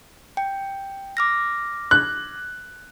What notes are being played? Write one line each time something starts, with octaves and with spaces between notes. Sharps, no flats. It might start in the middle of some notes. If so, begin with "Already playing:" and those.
G5
D6 F6 A#6
F#6